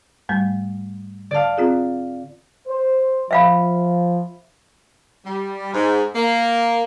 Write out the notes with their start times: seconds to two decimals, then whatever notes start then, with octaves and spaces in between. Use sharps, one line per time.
0.29 G#2 G3 A3
1.31 D3 D5 F5 A5
1.58 C4 F4 G#4
2.67 C5
3.31 F3 E5 F5 B5
5.25 G3
5.74 G#2
6.14 A#3